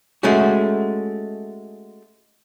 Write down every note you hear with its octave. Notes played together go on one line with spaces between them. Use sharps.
G#3 A3 C#4 F#4